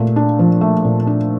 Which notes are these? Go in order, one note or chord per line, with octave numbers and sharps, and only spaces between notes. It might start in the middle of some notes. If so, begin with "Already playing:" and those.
Already playing: A#2 A3
D4
F3
A3
A#2
D4